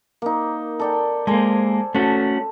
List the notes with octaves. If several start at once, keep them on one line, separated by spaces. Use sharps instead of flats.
A#3 D#4
A4 D5 G5
G#3 A#3 A4 C5 G#5
A3 C#4 F#4 A4